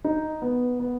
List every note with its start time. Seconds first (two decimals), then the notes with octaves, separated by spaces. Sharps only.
0.04 D#4
0.42 B3
0.80 B3